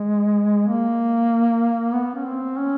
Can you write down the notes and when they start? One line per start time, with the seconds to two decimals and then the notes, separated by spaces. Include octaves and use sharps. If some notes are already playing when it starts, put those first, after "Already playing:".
Already playing: G#3
0.68 A#3
1.95 B3
2.15 C#4
2.27 C4
2.58 C#4